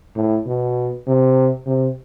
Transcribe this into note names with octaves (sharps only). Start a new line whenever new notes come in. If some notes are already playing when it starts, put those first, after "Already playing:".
A2
B2
C3
C3